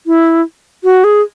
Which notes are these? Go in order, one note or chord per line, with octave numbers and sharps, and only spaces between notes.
E4
F#4
G#4